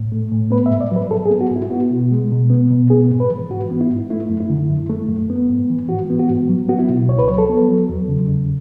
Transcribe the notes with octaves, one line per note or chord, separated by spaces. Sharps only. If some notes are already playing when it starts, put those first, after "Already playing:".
Already playing: A2
A3
A2
B3 B4
E5
G#2
D5
F#3 B4
G#2 A4
G#4
B3
F#4
G#2 E4
B3 F#4
B2
G#3
B2
B3
B2
B3 G#4
G#2
B4
E3
G#2 F#4
B3
E4
G#2
A3 E4
F#2
E4
D3
F#2
A3
F#2
B3
G#2
E3
G#2 F#4
B3
F#4
G#2
F#3
B3 F#4
E4
B2
C#2 C#5
B4
F#3 C#5
A4
B3
F#3
E2
C#3
E2